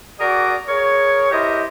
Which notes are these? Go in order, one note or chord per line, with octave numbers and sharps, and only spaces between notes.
F#4 G#4 A#4 D5
G#4 A#4 C#5
E4 G4 A#4 C5 D#5